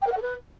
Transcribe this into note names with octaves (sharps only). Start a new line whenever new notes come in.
G5
A#4
F#5
A4
B4